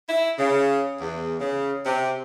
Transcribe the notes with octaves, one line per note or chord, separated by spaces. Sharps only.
E4
C#3
E2
C#3
C3